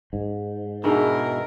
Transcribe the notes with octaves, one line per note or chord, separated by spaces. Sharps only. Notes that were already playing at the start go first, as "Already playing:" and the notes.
G#2
B2 E3 D4 D#4 G#4 A#4